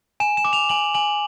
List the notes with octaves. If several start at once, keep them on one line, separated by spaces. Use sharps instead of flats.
G#5 E7
E7
D6
F7
G#5 F#7
G#5 F#7